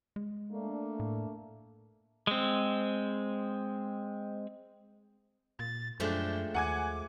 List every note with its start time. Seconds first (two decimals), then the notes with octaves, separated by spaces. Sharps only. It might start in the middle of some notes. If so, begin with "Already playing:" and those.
0.16 G#3
0.51 A3 A#3 D4
1.00 A2
2.27 G#3 C4
5.59 A#2 A6
6.00 F#2 F3 G#3 A3 D4 G5
6.54 D#2 F#5 G#5 D6 G#6